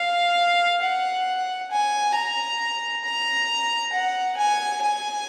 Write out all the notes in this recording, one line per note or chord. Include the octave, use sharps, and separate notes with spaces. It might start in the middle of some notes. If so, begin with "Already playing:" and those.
Already playing: F5
F#5
G#5
A#5
A#5
F#5
G#5
G#5